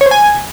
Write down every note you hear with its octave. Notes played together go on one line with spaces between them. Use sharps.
C#5
C5
G#5